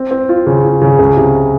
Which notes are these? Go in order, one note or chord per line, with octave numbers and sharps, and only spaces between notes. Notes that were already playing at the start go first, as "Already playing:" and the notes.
Already playing: C4
C4
F4
C#3
F4
C#3
C#2
C3